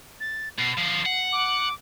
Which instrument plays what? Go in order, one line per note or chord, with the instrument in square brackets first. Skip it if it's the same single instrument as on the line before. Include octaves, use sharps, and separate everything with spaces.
[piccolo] A6
[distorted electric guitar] B2 [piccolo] C7
[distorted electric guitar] D3 F3 [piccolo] C7
[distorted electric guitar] F#5
[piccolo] D6